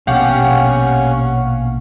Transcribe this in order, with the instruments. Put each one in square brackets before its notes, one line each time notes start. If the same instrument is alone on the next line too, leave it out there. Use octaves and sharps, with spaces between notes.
[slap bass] A#1 B2 B3 [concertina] C#4 [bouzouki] G4 [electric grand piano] F5 F#5